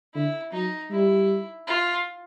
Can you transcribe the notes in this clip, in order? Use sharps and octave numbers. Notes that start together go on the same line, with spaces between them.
D3 E4
F#3 D#4
G3 E4
F4